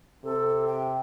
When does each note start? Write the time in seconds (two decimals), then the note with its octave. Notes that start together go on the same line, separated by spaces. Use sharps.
0.24 C3 A4
0.67 G5